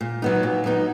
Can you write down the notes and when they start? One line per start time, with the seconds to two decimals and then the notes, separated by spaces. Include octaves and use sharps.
0.01 A#2
0.22 F#3 B3 D#4
0.43 A#2
0.64 F#3 B3 D#4